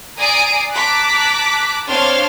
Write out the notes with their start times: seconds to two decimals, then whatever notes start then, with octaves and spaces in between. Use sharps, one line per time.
0.18 D5 G#5 A#5 D#6 C7 D7
0.74 A5 A#5 D6 F#6 B6
1.88 C4 D4 C#5 F5 C6 F6